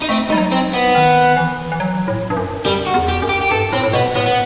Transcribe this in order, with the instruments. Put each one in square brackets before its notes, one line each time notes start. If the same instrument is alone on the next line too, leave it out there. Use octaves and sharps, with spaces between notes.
[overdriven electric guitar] D#4
[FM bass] A3 [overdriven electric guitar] C4
[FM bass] G3 [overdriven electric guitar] D#4
[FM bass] F#3
[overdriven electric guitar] C4
B3
[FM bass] D#3
E3
E3
F#3
A2
G2
F#2
[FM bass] F#2 [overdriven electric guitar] G3
[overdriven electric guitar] F#4
[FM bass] E2
[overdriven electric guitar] G4
[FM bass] F#2
[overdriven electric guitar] G4
G4
[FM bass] G2 [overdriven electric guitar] A4
[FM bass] A2 [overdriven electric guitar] C4
[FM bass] A2
[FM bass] B2 [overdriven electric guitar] B3
[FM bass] A2 [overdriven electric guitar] B3
[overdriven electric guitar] B3